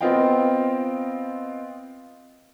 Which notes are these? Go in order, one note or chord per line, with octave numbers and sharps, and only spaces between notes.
B3 C4 F4 D#5 F5 G5